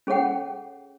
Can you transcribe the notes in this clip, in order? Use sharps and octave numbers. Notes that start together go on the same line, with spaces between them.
C#4 G#4 A4 C#5 F#5 G5